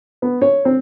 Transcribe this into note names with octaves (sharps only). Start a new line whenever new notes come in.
B3
C#5
C4